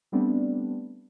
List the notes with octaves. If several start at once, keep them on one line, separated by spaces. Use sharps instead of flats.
G3 A3 B3 C4 D4